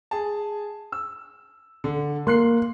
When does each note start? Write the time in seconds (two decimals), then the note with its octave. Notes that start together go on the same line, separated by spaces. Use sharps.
0.11 G#4 G#5 A5
0.92 E6
1.84 D3
2.27 A#3 C6 F#6 C7